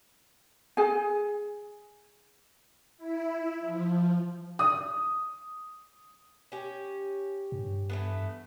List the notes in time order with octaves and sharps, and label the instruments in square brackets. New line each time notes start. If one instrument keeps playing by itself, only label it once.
[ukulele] G#4 G#5
[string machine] E4
F3
[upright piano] D#6
[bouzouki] C#4 G4
[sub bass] G2
[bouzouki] E3 A3 B3